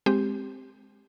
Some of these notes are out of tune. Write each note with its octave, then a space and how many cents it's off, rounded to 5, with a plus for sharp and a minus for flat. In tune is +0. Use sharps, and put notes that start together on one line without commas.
G#3 +0 C4 +0 G4 +0